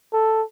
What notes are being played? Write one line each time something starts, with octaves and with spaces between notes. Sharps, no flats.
A4